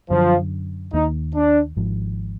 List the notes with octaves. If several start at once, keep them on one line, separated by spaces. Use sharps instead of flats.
F#2 D3 F3 F#3
D#2 D#3 A#3 D#4
D4
G#1 G#2 F3